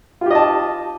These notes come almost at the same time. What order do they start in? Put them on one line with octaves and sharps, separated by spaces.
F4 G4 D#5 A5